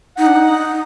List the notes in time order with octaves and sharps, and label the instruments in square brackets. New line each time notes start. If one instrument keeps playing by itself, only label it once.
[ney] D#4 [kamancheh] F#5
[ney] D4
D#4